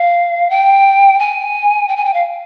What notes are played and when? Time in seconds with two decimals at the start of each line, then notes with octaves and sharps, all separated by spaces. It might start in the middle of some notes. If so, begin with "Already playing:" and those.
Already playing: F5
0.50 G5
1.20 G#5
1.88 G5
1.97 G#5
2.05 G5
2.14 F5